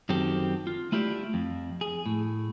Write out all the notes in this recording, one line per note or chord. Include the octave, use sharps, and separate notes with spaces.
F#2 D#3 C4 F#4 G4 A4
F4
A3 E4 F4 G4 A4 D5
F2
G#4
A2